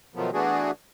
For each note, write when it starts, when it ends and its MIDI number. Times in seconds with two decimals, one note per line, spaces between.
0.15 0.30 47
0.15 0.30 51
0.15 0.30 53
0.15 0.30 54
0.15 0.30 57
0.15 0.30 59
0.33 0.71 52
0.33 0.71 57
0.33 0.71 59
0.33 0.71 62
0.33 0.71 66
0.33 0.71 68